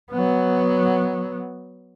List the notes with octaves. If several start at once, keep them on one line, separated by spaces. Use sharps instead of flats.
F#3 B3